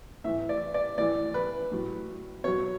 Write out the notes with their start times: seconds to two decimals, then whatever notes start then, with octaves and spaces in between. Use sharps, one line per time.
0.24 A2 E3 E5
0.49 D5
0.74 D5
0.98 A2 E3 D5
1.34 B4
1.72 A2 F#3
2.44 B2 F#3 C#5